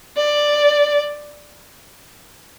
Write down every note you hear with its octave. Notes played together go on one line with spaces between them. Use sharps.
D5